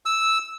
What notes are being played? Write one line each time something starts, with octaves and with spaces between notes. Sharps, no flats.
E6